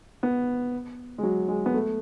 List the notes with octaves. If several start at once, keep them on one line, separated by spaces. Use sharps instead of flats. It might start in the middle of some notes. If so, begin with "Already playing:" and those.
B3
G#3
F#3
G#3
B3
A3